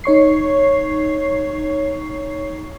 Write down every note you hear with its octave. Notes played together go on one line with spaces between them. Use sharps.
D#4 C#5 C#6 C7